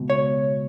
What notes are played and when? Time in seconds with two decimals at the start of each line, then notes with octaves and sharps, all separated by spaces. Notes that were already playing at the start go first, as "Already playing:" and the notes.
Already playing: C#2 B2
0.10 C#5